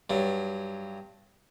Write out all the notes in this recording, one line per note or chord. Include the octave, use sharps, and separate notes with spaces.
G2 F#3